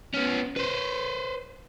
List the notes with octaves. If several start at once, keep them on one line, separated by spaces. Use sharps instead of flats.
B3 C#4
B4 C5